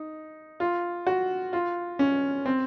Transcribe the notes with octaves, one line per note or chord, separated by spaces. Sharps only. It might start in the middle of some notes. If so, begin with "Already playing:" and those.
Already playing: D#4
F4
F#4
F4
C#4
C4